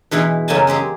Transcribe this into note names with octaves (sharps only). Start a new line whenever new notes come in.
B2 E3 G#3 E4
F#2 C#3 A#3 D#5 G#5 A5
G#3 C4 G4 G#4